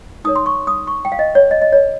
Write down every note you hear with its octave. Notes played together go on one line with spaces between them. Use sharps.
D#4 A#4 C#5 D#6
C6
C#6
D#6
C#6
G5
F5
D#5
C#5
D#5
D#5
C#5